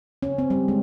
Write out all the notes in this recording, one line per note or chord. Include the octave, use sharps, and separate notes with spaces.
C#4
C4
G3
G#3